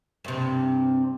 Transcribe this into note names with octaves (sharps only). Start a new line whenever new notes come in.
G2 C3